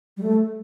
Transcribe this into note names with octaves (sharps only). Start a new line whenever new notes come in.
G3
A3